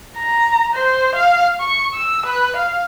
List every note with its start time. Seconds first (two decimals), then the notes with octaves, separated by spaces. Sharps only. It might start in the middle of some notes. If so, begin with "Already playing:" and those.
0.17 A#5
0.74 C5
1.15 F5
1.60 C#6
1.94 E6
2.26 B4
2.56 F5